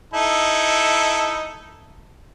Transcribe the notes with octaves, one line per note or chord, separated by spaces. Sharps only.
D#4 E4 A4